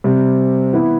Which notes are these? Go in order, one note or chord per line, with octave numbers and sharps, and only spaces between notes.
C3 G3 C4
E3 B3 E4